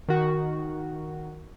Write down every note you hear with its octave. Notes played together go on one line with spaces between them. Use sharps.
D#3 F#4